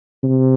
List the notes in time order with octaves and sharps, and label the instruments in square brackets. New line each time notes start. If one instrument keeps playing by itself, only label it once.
[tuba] C3